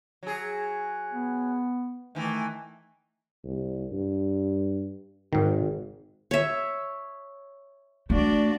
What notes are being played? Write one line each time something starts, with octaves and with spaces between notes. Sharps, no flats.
F#3 G#4
B3
D#3 E3 A3
C2
G2
G#1 G#2 D#3
C#5 E5
A3 D4 F#4 D5